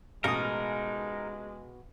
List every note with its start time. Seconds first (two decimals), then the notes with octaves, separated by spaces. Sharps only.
0.24 A1 B2 G#3 D#4 A#4 F5 D#6